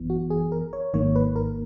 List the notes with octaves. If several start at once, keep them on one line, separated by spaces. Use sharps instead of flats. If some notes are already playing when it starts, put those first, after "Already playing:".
Already playing: G#1 F#2 E3 B3
F#4
G#4
A#4
C#5
G#1 G#2 D#3 A#3 C#5
B4
A#4